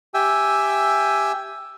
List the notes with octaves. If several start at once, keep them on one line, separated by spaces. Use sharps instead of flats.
G4 E5 G5 G#5 E6